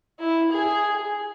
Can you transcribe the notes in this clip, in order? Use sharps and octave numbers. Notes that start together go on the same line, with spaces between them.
E4
G#4